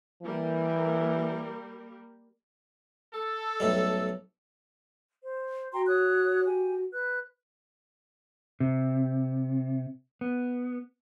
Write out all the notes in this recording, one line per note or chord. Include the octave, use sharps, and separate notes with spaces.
E3 G3 A#3 A#4
A4
B1 A2 G3
C5
F#4 G5 A#5 C6
C#5 D#6 F#6
G4 G#5
B4 F#6
C3
B3